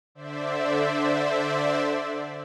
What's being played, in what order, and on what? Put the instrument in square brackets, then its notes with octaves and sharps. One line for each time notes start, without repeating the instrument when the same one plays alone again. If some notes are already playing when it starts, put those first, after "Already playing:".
[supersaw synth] D3 C5 D5 E5